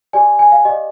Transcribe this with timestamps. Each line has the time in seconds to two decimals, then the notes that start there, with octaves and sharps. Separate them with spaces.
0.13 G4 D5 G#5
0.39 G#5
0.52 F5
0.65 G4 D5 D#5